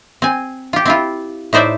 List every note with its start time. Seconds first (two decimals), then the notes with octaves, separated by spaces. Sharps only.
0.22 C4 G#5
0.73 F4 G4
0.85 C4 E4 F4
1.53 A2 D#4 C5 D5 E5